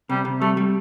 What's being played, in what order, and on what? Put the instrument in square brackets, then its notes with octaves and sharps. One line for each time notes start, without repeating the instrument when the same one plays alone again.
[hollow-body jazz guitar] C3 [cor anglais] G3
[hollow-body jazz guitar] C3
[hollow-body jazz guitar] G3 [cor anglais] A3
[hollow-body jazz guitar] G3